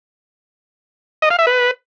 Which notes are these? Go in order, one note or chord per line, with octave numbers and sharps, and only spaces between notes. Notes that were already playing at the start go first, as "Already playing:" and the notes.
D#5
F5
E5
B4